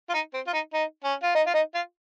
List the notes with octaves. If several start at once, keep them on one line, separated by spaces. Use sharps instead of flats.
F4
D#4
C4
F4
D#4
D#4
C#4
F4
D#4
F4
D#4
F4